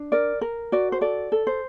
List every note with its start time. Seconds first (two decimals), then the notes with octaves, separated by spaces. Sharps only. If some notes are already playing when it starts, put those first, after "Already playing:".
Already playing: D4
0.12 A#4 D5
0.41 A#4
0.72 F#4 D5
0.92 C5
1.01 A4 D5
1.32 A4
1.47 C5